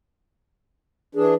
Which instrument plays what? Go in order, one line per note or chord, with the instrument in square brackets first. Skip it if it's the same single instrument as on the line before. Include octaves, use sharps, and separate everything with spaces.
[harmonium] E3 D4 [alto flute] G#4